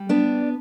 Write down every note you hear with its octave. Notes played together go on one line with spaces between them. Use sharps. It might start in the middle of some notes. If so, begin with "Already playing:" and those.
Already playing: G3
B3 D4